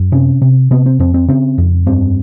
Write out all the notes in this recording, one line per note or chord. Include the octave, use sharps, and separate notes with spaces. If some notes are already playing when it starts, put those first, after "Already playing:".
Already playing: F#2
C3 C#4
C3
C3 B3
C4
F2 C4
C4
C#3 C4
F2
G2 C4